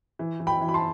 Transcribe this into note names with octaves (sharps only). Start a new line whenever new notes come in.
E3
E3
G5 B5
E3
B5
A5 C6